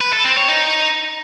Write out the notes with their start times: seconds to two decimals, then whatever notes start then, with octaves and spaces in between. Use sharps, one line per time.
0.01 B4
0.13 A4
0.25 C4
0.37 C#5
0.48 D#4